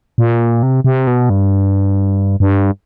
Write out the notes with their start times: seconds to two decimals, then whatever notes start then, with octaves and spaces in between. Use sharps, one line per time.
0.18 A#2
0.63 C3
0.84 C3
1.07 B2
1.30 G2
2.40 G2